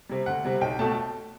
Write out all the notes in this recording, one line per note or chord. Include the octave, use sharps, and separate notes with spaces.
C3 G3
D2 F#5
C3 G3
B1 G5
B2 A3 A5